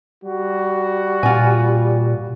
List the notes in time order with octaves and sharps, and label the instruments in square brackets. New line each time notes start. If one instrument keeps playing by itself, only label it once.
[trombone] G3 [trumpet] F#4
[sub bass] A#2 [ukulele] F4 G#5